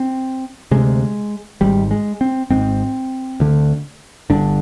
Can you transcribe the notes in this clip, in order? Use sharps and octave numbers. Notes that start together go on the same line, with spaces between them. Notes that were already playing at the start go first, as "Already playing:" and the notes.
Already playing: C4
D2 C3 G#3
G#1 G#2 G3
G#3
C4
G#1 G#2 C4
D2 D3
G1 G2 D3 D4